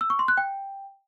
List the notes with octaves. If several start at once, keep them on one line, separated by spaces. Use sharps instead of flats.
E6
C#6
C6
F#6
G5